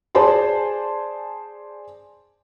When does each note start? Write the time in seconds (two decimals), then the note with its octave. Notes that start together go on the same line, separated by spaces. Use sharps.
0.15 G#4 C5 D5 G#5 A5 C6